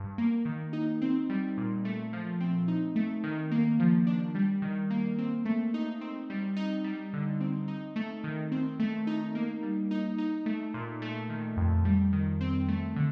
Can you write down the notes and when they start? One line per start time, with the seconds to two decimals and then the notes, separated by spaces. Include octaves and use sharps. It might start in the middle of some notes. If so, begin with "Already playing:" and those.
Already playing: G2
0.18 A#3
0.45 D#3
0.73 D#4
1.02 C4
1.30 G3
1.57 A#2
1.85 A3
2.13 F3
2.40 C4
2.68 D#4
2.96 A3
3.24 D#3
3.51 A#3
3.79 F3
4.07 D4
4.35 G3
4.62 D#3
4.90 A#3
5.18 C4
5.45 A3
5.74 D#4
6.01 C4
6.30 G3
6.56 D#4
6.84 G3
7.13 D3
7.41 C4
7.68 D#4
7.96 A3
8.24 D#3
8.52 C4
8.80 A3
9.07 D#4
9.35 A#3
9.63 G3
9.91 D#4
10.18 D#4
10.46 A3
10.74 A#2
11.02 A3
11.30 D#3
11.57 F2
11.85 G3
12.13 D#3
12.41 C4
12.68 A3
12.96 D3